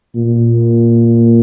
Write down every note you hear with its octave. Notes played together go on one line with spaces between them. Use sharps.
A#2